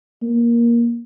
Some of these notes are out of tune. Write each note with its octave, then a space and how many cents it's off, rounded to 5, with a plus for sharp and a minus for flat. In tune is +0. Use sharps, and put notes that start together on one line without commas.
A#3 +15